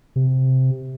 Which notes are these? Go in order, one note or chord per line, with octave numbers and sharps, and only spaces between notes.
C3